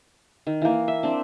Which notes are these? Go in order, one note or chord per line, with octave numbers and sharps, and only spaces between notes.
D#3
E3 A#3
E5
C4 D4